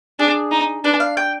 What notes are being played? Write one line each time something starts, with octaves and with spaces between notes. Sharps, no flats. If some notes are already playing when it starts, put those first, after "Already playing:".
D4 G#4
D#4
D4 B4
F5
G5